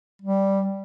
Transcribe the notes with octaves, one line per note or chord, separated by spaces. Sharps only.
G3